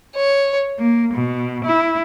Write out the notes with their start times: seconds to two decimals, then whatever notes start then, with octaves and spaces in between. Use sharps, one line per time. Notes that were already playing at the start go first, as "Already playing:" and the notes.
0.15 C#5
0.78 A#3
1.14 B2
1.64 E4